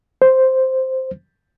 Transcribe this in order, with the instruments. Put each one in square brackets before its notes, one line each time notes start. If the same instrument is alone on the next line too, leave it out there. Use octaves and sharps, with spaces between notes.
[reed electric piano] C5